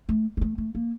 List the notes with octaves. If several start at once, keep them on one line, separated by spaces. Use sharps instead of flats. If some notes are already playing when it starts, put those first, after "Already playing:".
A3
G3
A3
A3
A#3